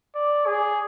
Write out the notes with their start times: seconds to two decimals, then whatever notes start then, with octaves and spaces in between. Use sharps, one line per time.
0.15 D5
0.47 G#4